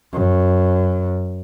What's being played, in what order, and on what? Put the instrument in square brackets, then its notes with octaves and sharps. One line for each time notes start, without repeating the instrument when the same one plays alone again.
[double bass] F#2